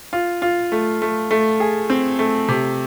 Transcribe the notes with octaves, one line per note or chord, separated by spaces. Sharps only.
F4
F4
A3
A3
A3
G#4
C4
A3
C3